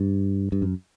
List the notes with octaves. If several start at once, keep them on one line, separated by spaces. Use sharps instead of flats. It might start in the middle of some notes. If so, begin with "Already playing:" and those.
Already playing: G2
G2
F#2